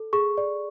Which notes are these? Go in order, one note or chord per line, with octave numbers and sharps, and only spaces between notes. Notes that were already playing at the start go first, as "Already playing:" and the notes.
Already playing: A4
G#4 C#6
D5